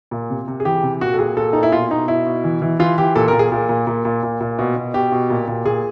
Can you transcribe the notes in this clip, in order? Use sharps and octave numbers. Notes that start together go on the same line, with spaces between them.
A#2
C3
C3
G#4
E3 G4
C3
A#2 F#4
A4
A#2 G#4
A#2 A4
A#2 D#4
E4
B2 F4
B2 D#4
B2 E4
B2
E3
E3
E3 F4
E3 G4
A#2 A4
A#4
A#2
G#4
A#2
A#2
A#2
A#2
A#2
A#2
B2
B2
B2 G4
B2
A#2
A#2
A#2 G#4